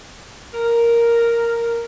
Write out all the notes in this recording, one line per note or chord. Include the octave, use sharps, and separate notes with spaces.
A#4